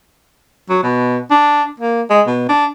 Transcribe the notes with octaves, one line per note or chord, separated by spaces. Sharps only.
F#3
B2
D4
A#3
G#3
B2
D4